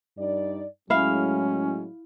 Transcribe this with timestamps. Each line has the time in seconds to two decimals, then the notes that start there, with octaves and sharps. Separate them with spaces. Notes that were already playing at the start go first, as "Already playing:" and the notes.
0.18 G2 D#4 D5
0.90 A2 F#3 G#3 C#4 E4 F5